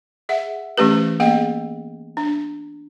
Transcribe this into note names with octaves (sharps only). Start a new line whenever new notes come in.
G#4 E5 F#5
E3 A3 C#4 G4 B4
A#3 B3 G#4 D#5 G5
D4